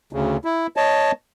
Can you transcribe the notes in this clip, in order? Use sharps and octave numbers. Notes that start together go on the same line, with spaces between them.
D2 C#3
E4
C#5 D#5 A5